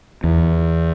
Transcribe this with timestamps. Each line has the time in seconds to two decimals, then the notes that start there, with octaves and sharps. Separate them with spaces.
0.24 E2